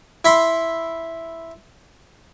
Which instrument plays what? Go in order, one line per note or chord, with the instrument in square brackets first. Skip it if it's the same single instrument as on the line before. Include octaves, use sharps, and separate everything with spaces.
[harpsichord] E4 B5 C6